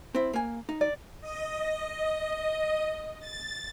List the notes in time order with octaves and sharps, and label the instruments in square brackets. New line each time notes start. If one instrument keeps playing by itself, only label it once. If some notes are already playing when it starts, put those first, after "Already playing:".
[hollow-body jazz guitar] C4 E4
A#3 G#5
D#4
[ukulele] D5
[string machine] D#5
A6